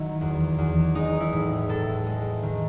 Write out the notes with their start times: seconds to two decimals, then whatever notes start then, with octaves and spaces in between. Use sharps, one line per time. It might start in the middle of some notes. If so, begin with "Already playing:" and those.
Already playing: D#3 F#3 E4
0.21 E2
0.58 E2
0.95 G#3 D#4
1.20 E4
1.33 A2
1.69 A2 A4
2.06 G#3
2.43 D#3